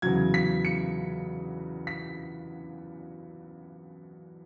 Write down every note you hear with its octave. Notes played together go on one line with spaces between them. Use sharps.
E2 C#3 F#3 G#6
B6
C#7
B6